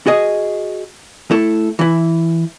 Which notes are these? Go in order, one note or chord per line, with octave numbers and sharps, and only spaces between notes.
F#4 G#4 D#5
A3 E4 A4
E3 E4